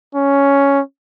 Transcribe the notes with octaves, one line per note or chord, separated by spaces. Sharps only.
C#4